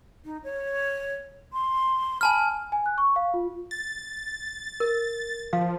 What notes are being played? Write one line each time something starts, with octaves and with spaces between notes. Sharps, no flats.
D#4
C#5
C6
G#5 A5 B5 F6
G#5
F#6
C#6
F5
F4
A6
A#4
F3 F5